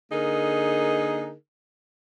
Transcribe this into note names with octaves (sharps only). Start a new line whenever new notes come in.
D3 A#3 D#4 G#4 A#4